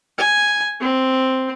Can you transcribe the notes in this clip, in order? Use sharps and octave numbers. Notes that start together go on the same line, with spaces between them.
G#5
C4